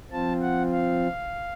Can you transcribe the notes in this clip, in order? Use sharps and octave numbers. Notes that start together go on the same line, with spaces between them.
F3 C4 F4 A5
F#5
F5